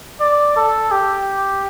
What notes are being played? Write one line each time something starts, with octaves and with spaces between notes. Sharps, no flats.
D5
A4
G4